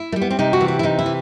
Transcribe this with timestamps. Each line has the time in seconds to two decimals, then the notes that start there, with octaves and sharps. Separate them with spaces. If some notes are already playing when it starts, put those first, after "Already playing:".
Already playing: E4
0.12 A3
0.16 G3
0.22 B3
0.30 C4
0.39 C3 D#4
0.53 F#4
0.61 E3
0.68 F#4
0.79 E4
0.83 C3 D#4
0.99 E4
1.06 E3